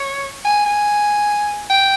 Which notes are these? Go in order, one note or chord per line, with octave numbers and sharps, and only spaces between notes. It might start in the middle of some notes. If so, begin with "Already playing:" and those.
Already playing: C#5
G#5
G#5
G5